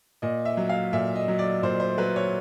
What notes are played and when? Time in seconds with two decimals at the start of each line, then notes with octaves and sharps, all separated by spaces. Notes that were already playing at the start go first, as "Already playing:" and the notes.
0.22 A#2 D#5
0.45 E5
0.57 F#3
0.69 F5
0.93 A#2 E5
1.15 D#5
1.28 F#3
1.39 D5
1.63 A#2 C5
1.80 C5
1.98 F#3 B4
2.16 C#5